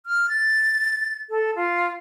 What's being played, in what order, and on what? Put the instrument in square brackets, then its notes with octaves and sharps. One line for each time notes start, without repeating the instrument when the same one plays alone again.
[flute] F6
A6
A4
F4